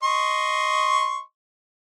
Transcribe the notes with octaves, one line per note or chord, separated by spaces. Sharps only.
D#5 C6 C#6